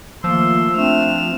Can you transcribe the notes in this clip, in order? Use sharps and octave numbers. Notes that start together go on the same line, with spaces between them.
D#3 F3 A3 A#3 C6 E6
A3 C4 D4 F6 E7